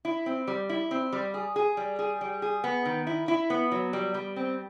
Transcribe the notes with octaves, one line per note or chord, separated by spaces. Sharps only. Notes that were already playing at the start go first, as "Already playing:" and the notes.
E4
C4
G3
E4
C4
G3
G#4
G#4
G3
G#4
G3
G#4
B3
D#3
E4
E4
B3
F#3
G3
G3
C4